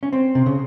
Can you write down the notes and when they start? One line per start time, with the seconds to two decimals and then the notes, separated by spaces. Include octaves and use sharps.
0.03 C#4
0.13 C4
0.35 C3
0.46 C#3